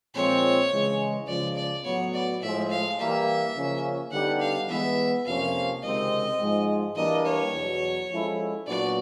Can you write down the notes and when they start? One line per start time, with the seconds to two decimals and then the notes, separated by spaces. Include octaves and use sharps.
0.14 A#2 F3 G#3 C4 C#5
0.71 C#3 E3 G#3
1.27 C#2 C#3 F3 D5
1.56 D5
1.84 A2 F#3 B3 C#5
2.14 D5
2.41 A2 F3 G#3 E5
2.71 F5
2.99 E3 G3 A#3 E5
3.55 C#3 F3 A#3 C#4
4.11 D3 G3 B3 D#4 G4 F#5
4.40 F5
4.69 E3 G#3 B3 E5
5.25 F2 C3 F3 A#3 C#4 F5
5.82 C#2 C3 D#3 G#3 C4 D#5
6.39 G#2 F3 G#3
6.96 E3 G3 A#3 D4 D#5
7.25 C#5
7.53 E2 B2 F#3
8.10 F3 G#3 C#4 E4 A4
8.66 A#2 F#3 B3 D4 F#4 D5